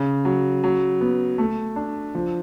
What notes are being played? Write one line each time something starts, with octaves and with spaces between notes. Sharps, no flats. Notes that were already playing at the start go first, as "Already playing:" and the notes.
Already playing: C#3
F#3
F#3
B3
A3
D4
F3